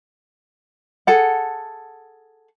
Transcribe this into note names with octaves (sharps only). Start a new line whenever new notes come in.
G#4 A4 F#5